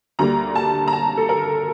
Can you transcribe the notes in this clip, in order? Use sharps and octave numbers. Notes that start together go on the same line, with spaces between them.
D2 D3 G3 A#3 A#5
A5
A#5
A5
A4
A#4